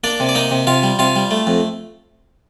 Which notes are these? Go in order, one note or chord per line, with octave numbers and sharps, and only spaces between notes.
A#3 D4 D5
C3
D5
A#3 D#4 D#5
C3
C3 F4 F5
G3
C3 F4 F5
G3
A3
F2